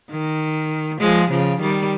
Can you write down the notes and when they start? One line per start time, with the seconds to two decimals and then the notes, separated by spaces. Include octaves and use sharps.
0.11 D#3
1.00 F3 G#3
1.31 C#3 F3
1.61 D#3 G3